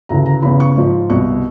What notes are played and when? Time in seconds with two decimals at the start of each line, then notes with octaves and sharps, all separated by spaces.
0.09 D2 C#3 E3 A#5
0.26 A#5
0.42 E2 C#3 E3 B5
0.60 C#6
0.76 G#2 F3
1.10 C2 B2 C#6